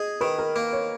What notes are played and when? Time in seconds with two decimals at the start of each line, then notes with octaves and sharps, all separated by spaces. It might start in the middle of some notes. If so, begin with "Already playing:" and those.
Already playing: G#4 D#5
0.21 D#3 B4
0.38 A#4
0.56 A#3
0.73 C#5